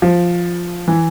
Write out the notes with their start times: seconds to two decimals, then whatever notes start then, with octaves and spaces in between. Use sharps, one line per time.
0.02 F3
0.88 E3